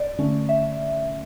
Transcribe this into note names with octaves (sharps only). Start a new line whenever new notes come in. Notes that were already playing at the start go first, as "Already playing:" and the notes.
Already playing: D5
D3 A3 C#4
E5